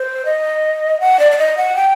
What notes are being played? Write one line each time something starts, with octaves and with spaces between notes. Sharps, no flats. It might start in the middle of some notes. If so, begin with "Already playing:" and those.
Already playing: C5
D#5
F#5
D5
D5
D#5
F#5
G5